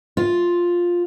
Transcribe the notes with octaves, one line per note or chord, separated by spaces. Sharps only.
F4